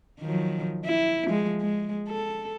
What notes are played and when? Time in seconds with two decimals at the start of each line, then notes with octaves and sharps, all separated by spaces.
0.20 D#3 F3 F#3
0.85 E4
1.26 F3 G#3
1.61 G#3
2.08 A4